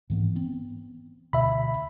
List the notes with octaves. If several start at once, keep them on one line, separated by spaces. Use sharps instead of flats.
G#2 E3 B3
B3 C4
D2 B2 E5 B5